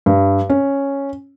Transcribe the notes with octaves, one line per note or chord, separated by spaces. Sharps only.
G2
C#4